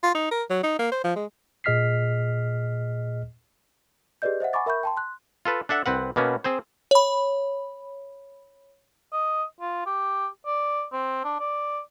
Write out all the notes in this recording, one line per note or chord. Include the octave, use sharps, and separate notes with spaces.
F4
D#4
A#4
F#3
D#4
A#3
C5
F3
G#3
A#2 G#4 D#5 F6 B6 C7
G4 G#4 B4 D5 D#5 G6
C5 D#5 E5 F#5
F#5 G#5 B5 C#6 D6 A6
A#4 E5 B5 C#6 G6
G5 A5 C6
C6 F#6
F4 A4 B4
D4 A4 E5 F#5
C2 C4 B4 F#5
B2 A#3 B3 C#4
C4 G#4 C5
C#5 B5
D#5
F4
G4
D5
C4
D4
D5